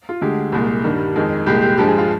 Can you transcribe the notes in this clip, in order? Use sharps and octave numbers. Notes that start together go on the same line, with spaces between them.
F4
D2 D3 G#3 G4
C2 A#2 G#3
G2 D#3 G3
F2 D#3 G#3
C2 A#2 G#3 G4
G4
G2 F3 G#3 G4
G#4
F4